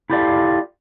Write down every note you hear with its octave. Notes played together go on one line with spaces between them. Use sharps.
E4 F4 G4 A4 D5 F5